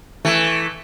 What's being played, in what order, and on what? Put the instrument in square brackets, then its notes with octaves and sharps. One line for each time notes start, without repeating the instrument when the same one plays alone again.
[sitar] E3 A3